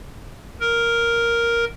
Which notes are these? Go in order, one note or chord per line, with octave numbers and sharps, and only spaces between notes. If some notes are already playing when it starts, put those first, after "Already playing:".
A#4